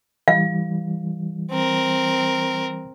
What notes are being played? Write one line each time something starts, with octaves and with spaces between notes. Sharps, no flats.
E3 G3 F5
C4 A#4